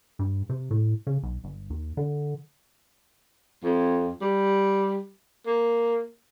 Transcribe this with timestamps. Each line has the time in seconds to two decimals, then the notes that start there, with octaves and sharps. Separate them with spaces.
0.19 G2
0.49 C3
0.71 A2
1.07 C#3
1.23 B1
1.44 G1
1.70 D#2
1.97 D3
3.64 F2
4.22 G3
5.47 A#3